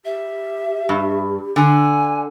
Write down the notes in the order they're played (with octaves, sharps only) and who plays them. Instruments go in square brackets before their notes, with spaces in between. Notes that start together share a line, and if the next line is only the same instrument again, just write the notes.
[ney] G4 [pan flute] E5
[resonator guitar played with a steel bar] G2
[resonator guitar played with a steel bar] D3 [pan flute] G#5